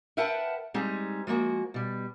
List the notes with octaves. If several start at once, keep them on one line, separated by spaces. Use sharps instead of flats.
A#4 B4 E5 F#5 G5 A5
G3 G#3 C4 D#4 G#4
F3 G#3 A#3 F#4
B2 G3